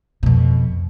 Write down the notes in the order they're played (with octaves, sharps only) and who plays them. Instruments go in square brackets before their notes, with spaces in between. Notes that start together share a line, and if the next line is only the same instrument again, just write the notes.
[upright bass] F2 B2